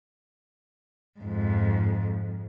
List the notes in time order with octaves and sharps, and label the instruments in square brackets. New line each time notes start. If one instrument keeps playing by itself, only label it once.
[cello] F2 G#2